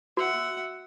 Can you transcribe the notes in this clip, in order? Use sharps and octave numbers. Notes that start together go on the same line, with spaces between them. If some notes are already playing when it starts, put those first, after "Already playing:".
F#4 E5 F#5